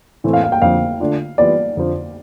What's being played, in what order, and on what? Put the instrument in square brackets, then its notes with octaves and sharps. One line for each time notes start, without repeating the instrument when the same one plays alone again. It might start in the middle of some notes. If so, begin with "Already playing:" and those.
[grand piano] A2 E3 A3 C4
[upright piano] F5
F5
G5
[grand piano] F2 D3 F3 [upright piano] F5
[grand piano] D3 A3 D4 F4
[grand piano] E3 G3 B3 F4 [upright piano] D5
[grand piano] F2 D3 F3